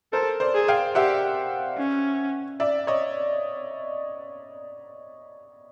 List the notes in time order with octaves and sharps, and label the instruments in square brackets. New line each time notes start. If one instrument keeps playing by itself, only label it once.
[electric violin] A4 [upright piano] A#4 C5
[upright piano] C5 D5
[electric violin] G#4
[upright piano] F5 G5
[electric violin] G4 [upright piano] E5 F#5
[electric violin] C#4
[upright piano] D5 E5
C#5 D#5